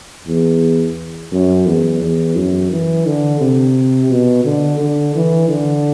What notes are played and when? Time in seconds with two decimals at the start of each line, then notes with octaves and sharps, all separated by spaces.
0.28 E2
1.33 F#2
1.66 E2
2.02 E2
2.36 F#2
2.72 E3
3.06 D3
3.41 C3
4.11 B2
4.45 D3
4.80 D3
5.15 E3
5.49 D3